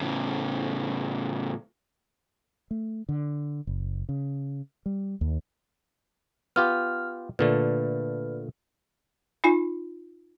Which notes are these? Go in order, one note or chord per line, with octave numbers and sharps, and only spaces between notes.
A2 C#3
A3
D3
F#1
C#3
G3
D#2
B3 F4 G4 F6
A#2 D3 A3 B4
D#4 F4 G#5